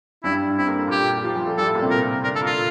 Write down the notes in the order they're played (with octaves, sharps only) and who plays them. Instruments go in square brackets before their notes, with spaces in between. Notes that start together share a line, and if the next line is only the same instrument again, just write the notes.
[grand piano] G2 G3 [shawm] E4
[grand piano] C4 [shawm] E4
[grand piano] A#3
A3
[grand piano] A#2 A#3 [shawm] G4
[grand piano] G4
F3 F4
G3 G4
A3 A4
[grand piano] G3 G4 [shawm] A4
[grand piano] A2 A3
A#2 A#3
C3 C4
[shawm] A#4
[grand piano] D3 D4 [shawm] A#4
[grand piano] A3 [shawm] A4
[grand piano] A#2 A#3
[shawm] F4